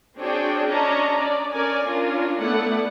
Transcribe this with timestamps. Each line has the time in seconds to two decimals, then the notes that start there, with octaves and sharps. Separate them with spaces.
0.17 C4 D4 F#4 G#4 C#5 G5
0.67 C#4 D4 C#5 D#5 A5 A#5
1.18 D5
1.51 C#4 A#4 D5 G#5
1.85 C#4 D4 F4 A#4
2.39 A3 B3 E4 A4 D5 F#5